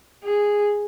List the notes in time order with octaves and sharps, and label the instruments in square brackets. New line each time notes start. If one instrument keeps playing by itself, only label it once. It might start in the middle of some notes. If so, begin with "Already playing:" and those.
[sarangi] G#4